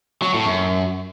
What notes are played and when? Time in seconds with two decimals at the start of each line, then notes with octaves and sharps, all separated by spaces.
0.22 F#3
0.34 A2
0.45 F#2